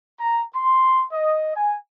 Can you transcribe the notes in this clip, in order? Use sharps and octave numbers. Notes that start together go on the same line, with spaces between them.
A#5
C6
D#5
G#5